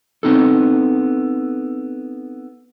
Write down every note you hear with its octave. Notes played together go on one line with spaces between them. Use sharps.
B3 C4 D#4 A4